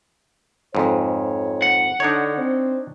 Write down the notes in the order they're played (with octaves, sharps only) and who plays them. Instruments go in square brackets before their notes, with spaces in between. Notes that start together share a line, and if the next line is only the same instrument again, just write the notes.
[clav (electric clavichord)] F2 G#2 [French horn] C#5
[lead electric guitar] F#5
[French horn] D3 [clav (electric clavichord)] D4 D#4 C#5
[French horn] C4